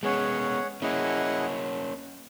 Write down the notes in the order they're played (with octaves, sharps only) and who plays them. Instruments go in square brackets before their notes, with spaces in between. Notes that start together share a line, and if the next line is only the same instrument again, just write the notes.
[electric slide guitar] G#3 B3 [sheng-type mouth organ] C#4 G#4 C#5 F#5
[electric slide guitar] A#3 C#4 [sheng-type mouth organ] E4 G#4 D#5 F#5